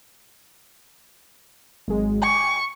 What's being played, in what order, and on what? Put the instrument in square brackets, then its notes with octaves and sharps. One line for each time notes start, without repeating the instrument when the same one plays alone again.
[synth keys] G#1 F#3 G#3
[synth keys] G5 G#5 D6 [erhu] C#6